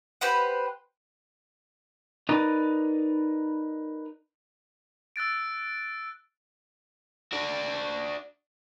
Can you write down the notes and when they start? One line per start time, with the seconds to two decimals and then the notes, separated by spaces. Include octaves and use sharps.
0.21 G4 B4 C5 F#5
2.29 D#4 A#4 B4 D5 D#5 A#5
5.16 E6 F#6 A6 D7
7.32 D4 F#4